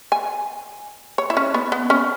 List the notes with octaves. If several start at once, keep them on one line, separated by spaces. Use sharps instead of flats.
G#5
C#5
E4
C#4
B3
B3
C#4